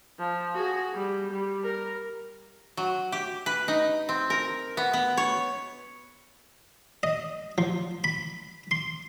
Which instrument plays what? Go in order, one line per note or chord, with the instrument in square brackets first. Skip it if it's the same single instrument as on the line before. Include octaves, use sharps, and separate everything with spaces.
[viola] F3
F#4 G#4
G3
G3
A#4
[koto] F#3
G4
B4
D#4
C4
A#4
B3
B3
C#5
[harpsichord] D#5
F3
B5
C6